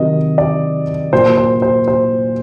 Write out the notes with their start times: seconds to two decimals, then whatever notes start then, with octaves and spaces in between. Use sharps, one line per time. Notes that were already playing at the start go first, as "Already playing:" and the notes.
Already playing: C3 D#3 F#3 D#5
0.38 D5
1.13 A#2 F#3 C5
1.38 C5
1.62 C5
1.88 C5